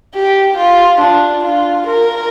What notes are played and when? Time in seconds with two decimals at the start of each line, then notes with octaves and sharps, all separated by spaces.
0.15 G4
0.58 F4
1.01 D4
1.44 F4
1.87 A#4